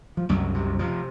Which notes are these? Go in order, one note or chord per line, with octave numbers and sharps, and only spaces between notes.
F3
C2 F#2 F#3
C3
C3 F3